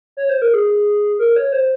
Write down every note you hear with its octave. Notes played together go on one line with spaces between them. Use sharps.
C#5
C5
A#4
G#4
A#4
C#5
C5